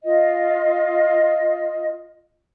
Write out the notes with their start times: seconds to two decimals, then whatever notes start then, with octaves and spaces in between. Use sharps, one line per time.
0.04 F4 D#5